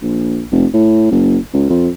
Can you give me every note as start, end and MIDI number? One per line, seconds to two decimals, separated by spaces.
0.02 0.45 34
0.52 0.66 29
0.74 1.10 45
1.11 1.38 30
1.54 1.66 37
1.69 1.89 41